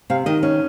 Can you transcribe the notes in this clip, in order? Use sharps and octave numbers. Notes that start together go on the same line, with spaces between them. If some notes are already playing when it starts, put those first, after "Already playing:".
C3 F5
D#3 D#5
C#4